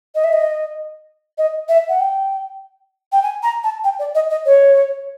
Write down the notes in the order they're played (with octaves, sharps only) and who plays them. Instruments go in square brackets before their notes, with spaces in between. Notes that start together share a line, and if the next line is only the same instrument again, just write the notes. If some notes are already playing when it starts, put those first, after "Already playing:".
[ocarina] D#5
E5
D#5
D#5
E5
F#5
G5
G5
G#5
A#5
A5
G5
D5
D#5
D#5
C#5